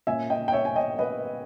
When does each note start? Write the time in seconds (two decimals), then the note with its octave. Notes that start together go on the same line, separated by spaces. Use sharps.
0.07 A#2 A#3 C#4 E5 G#5
0.30 D#5 G5
0.48 G5
0.52 C#5 E5
0.65 G#5
0.76 D#5 G5
0.99 B4 D#5